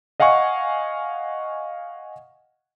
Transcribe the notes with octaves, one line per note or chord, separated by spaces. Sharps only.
D#5 F5 F#5 G#5 C#6